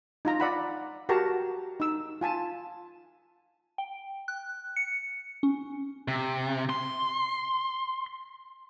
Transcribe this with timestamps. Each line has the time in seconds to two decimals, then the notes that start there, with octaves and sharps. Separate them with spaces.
0.25 D#4 F4 A#5
0.40 D5 F#5 B5
1.09 F#4 G4 A#4 A5 A#5
1.80 D#4 E6
2.21 F4 G#5 A5
3.78 G5
4.28 F#6
4.76 C#7
5.43 C#4
6.08 C3
6.70 C6